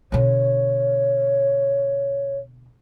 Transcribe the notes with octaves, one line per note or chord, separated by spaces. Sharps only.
B2 D3 C#5